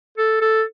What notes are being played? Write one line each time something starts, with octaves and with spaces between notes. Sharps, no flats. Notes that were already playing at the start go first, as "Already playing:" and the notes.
A4
A4